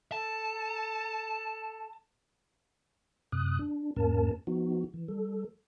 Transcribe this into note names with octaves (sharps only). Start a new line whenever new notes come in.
A4 A5
F#2 C3 D#6 F#6
D4
E2 G#2 A#3 C#4 A#4 A5
F3 B3 D#4 F#4
E3
G3 A4